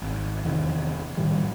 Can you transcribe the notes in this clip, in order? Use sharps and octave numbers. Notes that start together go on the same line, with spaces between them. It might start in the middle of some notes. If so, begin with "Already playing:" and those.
G#1
E2 C3 D#3
A2 D#3 F3 G3